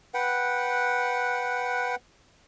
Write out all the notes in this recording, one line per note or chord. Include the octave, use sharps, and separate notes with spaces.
B4 F#5 G5